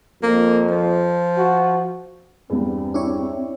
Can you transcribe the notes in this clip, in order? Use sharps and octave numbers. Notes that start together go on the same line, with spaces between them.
F2 A#3
F3
F#4
E2 G2 C4
D4 E4 C#5